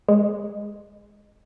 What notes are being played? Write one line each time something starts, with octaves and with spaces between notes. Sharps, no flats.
G#3